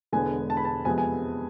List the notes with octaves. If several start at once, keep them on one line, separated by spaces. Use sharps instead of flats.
E1 E2 D3 G#3 B3 G#5
A5
B5
A5
F2 C3 G#3 B3 G#5
G#5